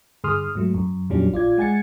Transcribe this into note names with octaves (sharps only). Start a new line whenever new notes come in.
G2 D3 G#4 C6 D#6 F6
G#2 F#3 A3
F#2
F2 A#2 F#3 G3 C#4 D4
A#1 F4 D5 G#6
G#3 F#5 G#5 G#6 A6 C#7